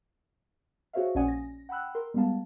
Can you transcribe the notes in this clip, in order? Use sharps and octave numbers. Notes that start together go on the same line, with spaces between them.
F#4 G#4 C5 C#5 E5 F5
A#1 C#4 D5 F#5 G#5 D#6
A#6
F#5 G5 B5 E6 F#6
A#4 C6
G3 G#3 B3 F5 A5